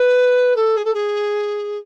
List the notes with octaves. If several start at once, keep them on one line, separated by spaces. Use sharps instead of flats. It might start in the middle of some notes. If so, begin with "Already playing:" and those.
Already playing: B4
A4
G#4
A4
G#4